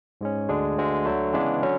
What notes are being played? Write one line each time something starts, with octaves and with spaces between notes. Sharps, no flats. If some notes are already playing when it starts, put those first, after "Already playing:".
G#2 G#3 C#4
D2 D3 G#3 D4 G#4
D2 D3 G#3
D3 F#3 A3
C#3 E3 G#3 B3 D4
D3 F#3 C#4